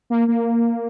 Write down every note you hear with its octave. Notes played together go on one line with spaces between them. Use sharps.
A#3
A#3